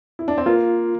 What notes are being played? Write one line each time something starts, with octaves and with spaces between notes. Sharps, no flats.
E4
D4
C4
A#3 F4